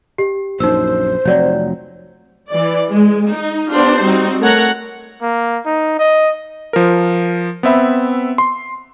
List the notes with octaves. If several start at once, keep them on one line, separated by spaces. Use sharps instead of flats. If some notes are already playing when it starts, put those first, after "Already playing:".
G4
A#1 F#2 D#4 C5 E6
F1 F#3 C4 D5 G6
E3 D5
G#3
D#4
B3 D4 F4 G4 C5
G3 C4 D#4 F#4
A3 A#4 C#5 F#5 A#5
A#3
D#4
D#5
F3 A#4
B3 C4 E5 B5
C6